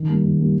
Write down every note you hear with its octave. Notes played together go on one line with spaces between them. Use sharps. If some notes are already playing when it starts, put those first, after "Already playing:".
Already playing: D#3
G3 A#3
D#3
G3 A#3